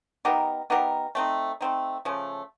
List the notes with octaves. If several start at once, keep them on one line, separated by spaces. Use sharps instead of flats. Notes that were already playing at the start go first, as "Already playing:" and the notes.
B3 D#4 G4 A#4
B3 D#4 G4 A#4
A3 C4 D#4
A3 C4 D#4
C#3 F3 A3